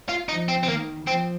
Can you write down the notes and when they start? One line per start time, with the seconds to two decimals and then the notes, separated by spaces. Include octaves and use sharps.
0.09 F4
0.29 F3 D#4
0.48 C4
0.63 C4
0.68 D#3 A#3
1.07 F3 C4